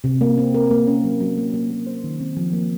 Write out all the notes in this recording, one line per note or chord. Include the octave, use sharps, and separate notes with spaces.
C3
A#3
C4
A#4
A#3
C#4
F#3
F#3
A#3
A#3
A#3
C5
D#3
C4
F3
A#3